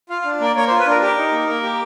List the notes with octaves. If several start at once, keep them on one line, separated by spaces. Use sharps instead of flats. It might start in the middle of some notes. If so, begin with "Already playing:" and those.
F4 F5
F5
D4
A#3 D5
A#3 C#5
C5
F4
B4
D4 A#4
G4 A#4
D#4
A#3
A#3
G4